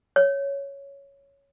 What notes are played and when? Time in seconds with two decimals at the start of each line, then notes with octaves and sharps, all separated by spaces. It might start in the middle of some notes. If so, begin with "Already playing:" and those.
0.16 C#5